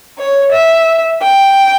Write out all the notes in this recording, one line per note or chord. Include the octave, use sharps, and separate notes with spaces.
C#5
E5
G5